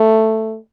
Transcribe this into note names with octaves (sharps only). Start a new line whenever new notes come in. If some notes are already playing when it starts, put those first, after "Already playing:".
Already playing: A3